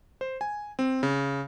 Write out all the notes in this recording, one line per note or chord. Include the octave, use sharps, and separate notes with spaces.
C5
G#5
C4
C#3